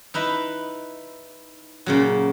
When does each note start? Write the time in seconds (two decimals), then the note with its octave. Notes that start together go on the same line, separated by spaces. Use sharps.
0.14 D#4 E4 B4 D#5
1.86 A#2 C#3 F#3